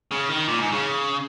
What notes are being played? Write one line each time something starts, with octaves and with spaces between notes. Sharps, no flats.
C#3
D#3
A#2
G#2
C#3